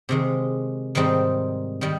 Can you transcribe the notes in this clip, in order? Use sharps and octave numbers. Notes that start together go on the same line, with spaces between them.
C3 D#3 G#3
G#2 D#3 G3 C4 D#4
D#3 G3